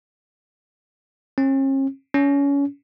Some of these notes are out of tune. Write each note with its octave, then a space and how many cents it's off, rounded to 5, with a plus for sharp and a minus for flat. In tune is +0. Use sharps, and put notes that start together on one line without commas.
C#4 -45
C#4 +25